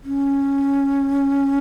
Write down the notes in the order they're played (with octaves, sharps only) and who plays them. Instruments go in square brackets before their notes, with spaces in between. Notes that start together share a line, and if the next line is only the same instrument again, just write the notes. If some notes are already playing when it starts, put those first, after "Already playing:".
[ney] C#4